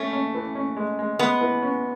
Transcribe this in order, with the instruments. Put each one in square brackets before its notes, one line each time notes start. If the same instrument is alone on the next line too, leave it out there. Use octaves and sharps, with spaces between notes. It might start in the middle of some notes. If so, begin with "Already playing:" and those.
Already playing: [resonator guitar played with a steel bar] A3 [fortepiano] C#4
[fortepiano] C#4
E3
C#4
G#3
G#3
[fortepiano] G#3 [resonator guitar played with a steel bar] B3
[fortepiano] E3
C#4